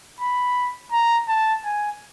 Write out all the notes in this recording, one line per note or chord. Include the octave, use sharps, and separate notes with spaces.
B5
A#5
A5
G#5